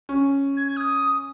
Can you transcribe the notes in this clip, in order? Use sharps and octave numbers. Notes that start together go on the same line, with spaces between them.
C#4
G#6
G#6
D#6